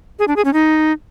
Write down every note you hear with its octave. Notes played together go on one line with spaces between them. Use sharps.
G#4
D4
G#4
C#4
D#4